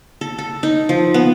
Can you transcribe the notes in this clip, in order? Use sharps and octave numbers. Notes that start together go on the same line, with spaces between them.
A4
A4
D#4
F3
B3